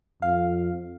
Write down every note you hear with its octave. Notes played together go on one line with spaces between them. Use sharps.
F2 F5